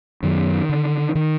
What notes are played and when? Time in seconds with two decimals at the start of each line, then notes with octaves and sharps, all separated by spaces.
0.23 F#2 D#3
0.69 D3
1.15 D#3